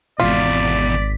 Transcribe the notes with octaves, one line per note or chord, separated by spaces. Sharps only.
G#1 E2 B2 F4 D5 B6